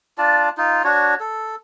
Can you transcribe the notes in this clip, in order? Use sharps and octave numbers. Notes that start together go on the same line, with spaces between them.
D4 F4 D5 A5
D#4 F4
D4 F#4 C#5
A4